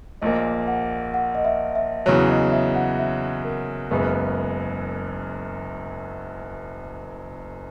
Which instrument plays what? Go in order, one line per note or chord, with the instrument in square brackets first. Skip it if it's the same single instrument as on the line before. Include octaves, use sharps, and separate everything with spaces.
[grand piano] A#1 A#2 A#3 [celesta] D#5
[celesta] F#5
F#5
D#5
E5
E5
[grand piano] E2 C#3 F#3 [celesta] C#5
[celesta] D#5
E5
F#5
E5
A#4
[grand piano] F#1 F#2 C#3 G#3 B3